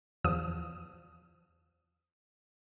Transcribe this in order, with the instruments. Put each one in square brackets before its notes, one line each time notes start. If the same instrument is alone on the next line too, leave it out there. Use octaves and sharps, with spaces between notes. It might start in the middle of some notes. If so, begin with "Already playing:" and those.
[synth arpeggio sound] E2 F3 D#6